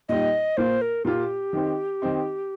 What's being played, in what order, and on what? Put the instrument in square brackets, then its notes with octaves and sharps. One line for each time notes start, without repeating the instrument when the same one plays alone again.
[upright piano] A#2 G3 D#4 [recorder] D#5
[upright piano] A#2 A#3 F4 [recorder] C5
[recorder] A#4
[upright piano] A#2 A#3 F4 [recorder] G4
[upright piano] D#3 C4 D#4
D#3 C4 D#4